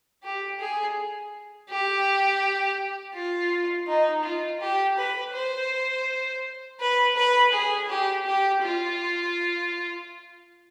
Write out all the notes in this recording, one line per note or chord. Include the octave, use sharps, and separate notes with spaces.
G4
G#4
G4
F4
D#4
F4
G4
B4
C5
B4
B4
G#4
G4
G4
F4